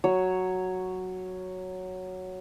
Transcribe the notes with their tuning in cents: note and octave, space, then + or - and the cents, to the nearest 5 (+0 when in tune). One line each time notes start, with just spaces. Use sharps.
F#3 +0 C#5 +0